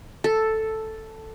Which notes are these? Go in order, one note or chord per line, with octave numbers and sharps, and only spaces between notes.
A4